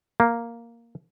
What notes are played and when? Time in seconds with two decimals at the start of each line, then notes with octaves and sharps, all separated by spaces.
0.20 A#3